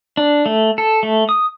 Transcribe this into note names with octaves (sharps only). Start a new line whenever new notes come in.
D4
A3
A4
A3
D#6